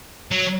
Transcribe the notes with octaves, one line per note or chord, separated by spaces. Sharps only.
F#3